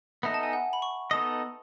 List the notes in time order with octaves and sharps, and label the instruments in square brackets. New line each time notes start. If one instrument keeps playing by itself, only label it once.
[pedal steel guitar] B3 D#4 A4 D#5 [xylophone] E5
[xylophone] A5
G#5
F#5
B5
C#6
[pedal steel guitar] B3 D#4 A4 D#5 [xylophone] D#6